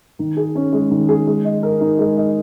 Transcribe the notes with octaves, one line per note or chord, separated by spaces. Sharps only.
D#3
G#4
C#4
G#3
D#3
G#4
G#3
D#5
A#4
D#4
G#3
D#5